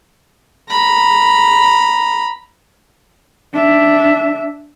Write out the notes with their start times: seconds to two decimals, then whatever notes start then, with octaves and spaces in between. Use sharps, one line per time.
0.70 A#5 B5
3.53 D4 E5